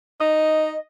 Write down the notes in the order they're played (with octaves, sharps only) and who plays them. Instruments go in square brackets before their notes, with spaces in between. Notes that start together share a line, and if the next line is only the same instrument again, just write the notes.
[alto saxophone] D#4 [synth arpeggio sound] D#5